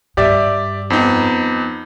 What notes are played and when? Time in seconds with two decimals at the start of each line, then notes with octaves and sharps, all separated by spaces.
0.17 G2 G4 D5 E5
0.90 F2 B3 D#4